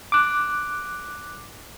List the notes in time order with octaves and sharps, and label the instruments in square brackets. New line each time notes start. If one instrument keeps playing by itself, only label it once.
[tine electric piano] D6 F#6